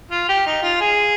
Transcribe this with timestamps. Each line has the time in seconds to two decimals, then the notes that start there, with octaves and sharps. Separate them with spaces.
0.11 F4
0.29 G4
0.46 D#4
0.63 F4
0.81 G#4